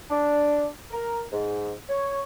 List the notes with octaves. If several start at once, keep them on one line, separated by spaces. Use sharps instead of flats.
D4
A#4
G#2
C#5